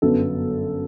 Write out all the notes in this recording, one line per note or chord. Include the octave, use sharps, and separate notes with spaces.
G1 F#2 D3 F#3 B3 A4